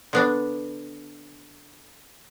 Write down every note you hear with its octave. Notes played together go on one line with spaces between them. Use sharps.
D3 B3 D4